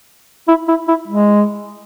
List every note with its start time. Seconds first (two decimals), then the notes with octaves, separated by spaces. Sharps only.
0.48 E4
0.68 E4
0.88 E4
1.07 G#3